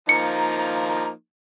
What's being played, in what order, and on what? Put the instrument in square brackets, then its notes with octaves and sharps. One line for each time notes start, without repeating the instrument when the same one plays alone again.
[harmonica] F3 A#3 D#4 [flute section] A#5 [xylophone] C#7